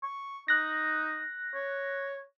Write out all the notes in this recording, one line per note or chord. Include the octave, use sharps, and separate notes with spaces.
C#6
D#4 F#6 A#6
C#5